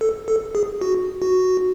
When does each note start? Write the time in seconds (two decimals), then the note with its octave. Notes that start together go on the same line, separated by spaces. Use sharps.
0.01 A4
0.28 A4
0.55 G#4
0.81 F#4
1.22 F#4